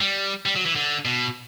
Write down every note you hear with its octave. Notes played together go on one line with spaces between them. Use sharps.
G3
G3
F#3
E3
D3
B2